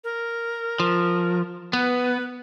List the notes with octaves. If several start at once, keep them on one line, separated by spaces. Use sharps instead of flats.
A#4
F3
B3 B4